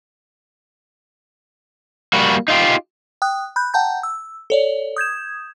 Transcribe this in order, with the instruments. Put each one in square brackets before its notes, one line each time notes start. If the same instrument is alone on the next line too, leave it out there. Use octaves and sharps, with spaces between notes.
[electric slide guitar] G3 A#3 F#4
D#4 F4 G4
[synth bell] G5 D#6 F#6
B5 F#6 G6
F#5 G5 A5 A#5 G6
E6
A4 C#5 D5
D#6 G6 G#6 E7